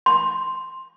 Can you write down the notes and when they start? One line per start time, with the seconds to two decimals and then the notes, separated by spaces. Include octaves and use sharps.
0.06 C6